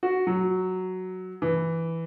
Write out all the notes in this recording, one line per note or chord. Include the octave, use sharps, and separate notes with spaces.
F#4
F#3
E3